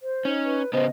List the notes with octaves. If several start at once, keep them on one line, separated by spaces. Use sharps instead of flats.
C5
C#4 D#4
B4
C#3 B3 C5 D#5